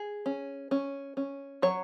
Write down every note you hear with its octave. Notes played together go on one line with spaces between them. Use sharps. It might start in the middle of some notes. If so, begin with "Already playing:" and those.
Already playing: G#4
C#4
C#4
C#4
F#3 C#5